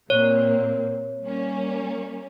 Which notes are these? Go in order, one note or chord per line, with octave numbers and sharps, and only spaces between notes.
A#2 A#3 C4 C#5
G3 A#3 C#4